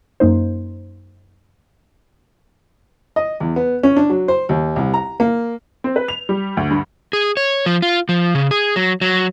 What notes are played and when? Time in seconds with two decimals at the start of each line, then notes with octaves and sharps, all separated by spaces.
0.20 F#2 A#3 D#4 C5
3.16 D#5
3.40 E2
3.56 B3
3.83 C#4
3.97 D4
4.10 F#3
4.28 C5
4.49 D#2
4.76 C2
4.94 A#5
5.20 A#3
5.84 C4
5.96 B4
6.08 F7
6.29 G3
6.57 D2
6.70 G2
7.13 G#4
7.37 C#5
7.66 F3
7.82 F4
8.09 F3
8.35 C#3
8.51 G#4
8.76 F#3
9.01 F#3